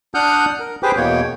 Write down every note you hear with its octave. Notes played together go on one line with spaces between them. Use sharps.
D4 F#5 D#6 F6 G6
A#4
G4 G#4 B4 C5 G5 D6
E2 B2 A#3 C#5 G5